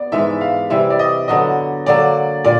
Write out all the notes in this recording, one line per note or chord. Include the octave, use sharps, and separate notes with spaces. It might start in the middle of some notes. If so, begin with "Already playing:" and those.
Already playing: B3 D5
G#2 E3 G#3 E5
F5
C3 E3 G3 E5
D5
D#5
D3 F#3 B3 D#5
D3 F#3 A#3 D5
A#2 D5